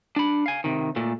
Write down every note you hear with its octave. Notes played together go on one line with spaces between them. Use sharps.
D4 B5
F5 G#5
C3 D#3
A#2 A3